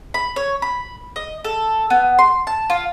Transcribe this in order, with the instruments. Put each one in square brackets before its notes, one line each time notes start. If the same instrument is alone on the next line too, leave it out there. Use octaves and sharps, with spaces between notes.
[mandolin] B5
C#5
B5
D#5
A4
B3
C6
A5
F4